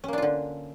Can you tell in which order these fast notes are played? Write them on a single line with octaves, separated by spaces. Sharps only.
C#4 A#3 D4 F4 D3